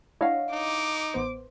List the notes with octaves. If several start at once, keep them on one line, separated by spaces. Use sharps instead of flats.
D4 E4 C#5 D#5 F5 F#5
D#4 D6
A1 B3 C5